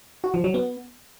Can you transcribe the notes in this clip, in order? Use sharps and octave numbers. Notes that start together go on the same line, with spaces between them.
F#4
F3
F#3
B3